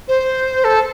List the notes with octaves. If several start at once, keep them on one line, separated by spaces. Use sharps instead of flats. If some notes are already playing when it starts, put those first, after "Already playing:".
C5
A4